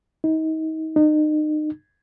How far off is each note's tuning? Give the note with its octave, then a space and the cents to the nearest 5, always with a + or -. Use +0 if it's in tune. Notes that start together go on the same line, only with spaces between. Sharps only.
D#4 +30
D#4 -35